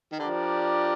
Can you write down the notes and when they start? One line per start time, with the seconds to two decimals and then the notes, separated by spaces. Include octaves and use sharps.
0.12 D#3
0.19 D3 F3 D4 G4 A#4 D5